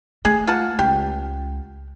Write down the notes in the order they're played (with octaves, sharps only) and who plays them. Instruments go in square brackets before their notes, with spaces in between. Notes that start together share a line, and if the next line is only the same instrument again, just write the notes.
[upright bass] A3 [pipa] G#4
[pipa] F4 F#5 A5
[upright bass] C#2 [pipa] G4